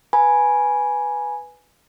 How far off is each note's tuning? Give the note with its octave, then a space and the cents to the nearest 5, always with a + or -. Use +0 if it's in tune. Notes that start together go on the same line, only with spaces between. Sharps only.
B4 +0 G#5 +0 B5 -35